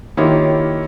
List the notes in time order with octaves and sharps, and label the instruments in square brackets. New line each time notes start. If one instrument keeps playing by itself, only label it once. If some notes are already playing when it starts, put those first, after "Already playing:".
[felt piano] D#3 A#3 E4 F4 G4 C#5